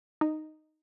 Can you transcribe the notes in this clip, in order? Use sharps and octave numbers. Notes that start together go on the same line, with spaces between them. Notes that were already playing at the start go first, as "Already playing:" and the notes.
D#4